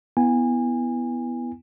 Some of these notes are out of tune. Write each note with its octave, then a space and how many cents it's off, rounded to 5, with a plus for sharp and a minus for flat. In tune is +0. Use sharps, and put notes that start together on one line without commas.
B3 +0 E4 +0 G#5 -25